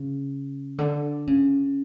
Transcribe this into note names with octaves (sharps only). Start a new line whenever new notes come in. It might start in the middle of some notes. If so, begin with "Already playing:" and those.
Already playing: C#3
D3
C#3